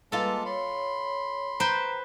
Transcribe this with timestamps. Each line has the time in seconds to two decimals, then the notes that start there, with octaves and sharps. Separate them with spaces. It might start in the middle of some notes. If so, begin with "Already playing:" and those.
0.12 G3 G#3 A#3 F4 A4 B4 A5 E6
0.45 C#5 B5 C6
1.60 B4 C5 G5 A#5